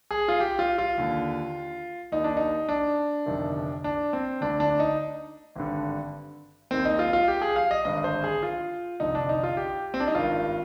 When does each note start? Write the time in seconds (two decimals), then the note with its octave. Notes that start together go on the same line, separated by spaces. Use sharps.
0.11 G#4
0.28 F4
0.40 G4
0.59 F4
0.78 F4
0.98 D#2 D3
2.12 D#2 D#3 D#4
2.24 D4
2.37 D#4
2.69 D4
3.26 G1 F2 C3 D#3
3.84 D4
4.13 C4
4.41 D2 D3 D4
4.60 D4
4.80 D#4
5.56 G#1 G2 D3
6.71 D#2 D#3 C4
6.85 D#4
6.99 F4
7.13 F4
7.28 G4
7.42 G#4
7.56 F5
7.71 D#5
7.85 G#1 G2 D3 D#5
8.04 C5
8.24 G#4
8.43 F4
9.00 F1 F2 D3 D#4
9.15 D4
9.29 D#4
9.43 F4
9.57 G4
9.94 C4
10.00 D4
10.07 D#4
10.15 G#1 G2 D#3 F4